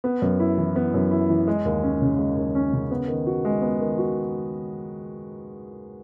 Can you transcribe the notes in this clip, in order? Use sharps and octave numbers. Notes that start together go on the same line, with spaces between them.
B3
F#2
E4
E3
B3
F#2
E4
E3
G#3
D#2
C#4
C#3
G#3
D#2
C#4
C#3
B3
D#3
F#4
G#3
B3
D#3
F#4